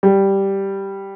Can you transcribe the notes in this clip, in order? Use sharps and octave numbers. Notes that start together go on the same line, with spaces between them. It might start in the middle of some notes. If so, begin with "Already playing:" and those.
G3